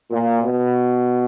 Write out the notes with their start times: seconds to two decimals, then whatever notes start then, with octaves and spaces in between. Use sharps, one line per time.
0.10 A#2
0.41 B2